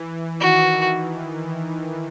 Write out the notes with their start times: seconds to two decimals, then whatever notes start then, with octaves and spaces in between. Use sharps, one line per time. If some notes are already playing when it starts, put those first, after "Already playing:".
Already playing: E3
0.40 D#3 F#4